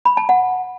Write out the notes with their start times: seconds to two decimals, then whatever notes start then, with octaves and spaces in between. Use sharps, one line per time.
0.05 B5
0.17 A5
0.29 F#5